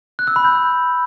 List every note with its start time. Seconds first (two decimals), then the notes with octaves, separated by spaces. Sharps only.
0.19 F#6
0.27 E6
0.36 B5
0.45 G6